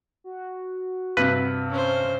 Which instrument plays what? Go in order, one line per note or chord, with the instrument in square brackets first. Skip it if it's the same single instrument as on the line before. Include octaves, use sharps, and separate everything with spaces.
[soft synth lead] F#4
[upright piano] G2 C3 [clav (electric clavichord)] B4
[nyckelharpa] C#4 C5